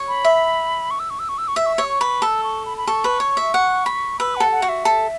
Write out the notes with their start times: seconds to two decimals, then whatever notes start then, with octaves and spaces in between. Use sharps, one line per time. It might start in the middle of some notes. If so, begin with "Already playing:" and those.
Already playing: C#5
0.08 B5
0.24 E5
0.91 C#6
1.00 E6
1.10 C#6
1.19 E6
1.29 C#6
1.38 E6
1.48 C#6
1.56 E5 E6
1.66 C#6
1.75 C#5 E6
1.85 C#6
2.01 B4
2.22 A4 E6
2.44 C#6
2.65 B5
2.78 B5
2.87 A4 C#6
3.04 B4
3.20 C#5
3.37 E5
3.54 F#5
3.86 B5
4.20 B4 E6
4.36 A4 F#5
4.52 F#5
4.62 F#4
4.69 E5
4.85 A4